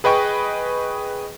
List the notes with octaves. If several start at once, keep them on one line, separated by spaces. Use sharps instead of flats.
G#4 B4 D#5 G5 C#6